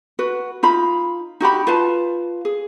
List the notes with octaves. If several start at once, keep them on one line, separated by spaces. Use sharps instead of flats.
F#4 B4
D#4 F4 B5
D#4 F#4 G4 B5
F4 B4 F5 A5
G#4